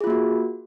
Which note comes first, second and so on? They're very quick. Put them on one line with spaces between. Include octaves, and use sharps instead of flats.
G#4 F4 A#3 F#4